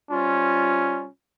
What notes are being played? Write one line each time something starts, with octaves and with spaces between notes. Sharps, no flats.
C3 G3 C#4 F4